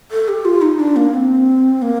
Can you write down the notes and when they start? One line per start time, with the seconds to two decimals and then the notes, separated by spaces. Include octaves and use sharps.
0.11 A4
0.28 G4
0.45 F4
0.62 D#4
0.79 D4
0.96 A#3
1.14 C4
1.82 A#3